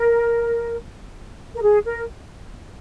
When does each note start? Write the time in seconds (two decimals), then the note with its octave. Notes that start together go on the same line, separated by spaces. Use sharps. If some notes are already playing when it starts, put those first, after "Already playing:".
Already playing: A#4
1.55 A#4
1.61 G#4
1.85 A#4